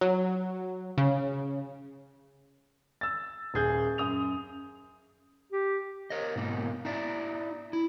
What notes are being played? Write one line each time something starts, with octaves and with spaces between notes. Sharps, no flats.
F#3
C#3
E6 A6
D#1 G#4 G6
F#2 D#6 F7
G4
A#4 C#5 D#5
G#2 B2 A#3 D#4
D#4 E4 D5
E4